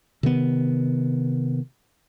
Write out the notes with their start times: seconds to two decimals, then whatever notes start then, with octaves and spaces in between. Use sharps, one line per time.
0.23 C3 D#3 B3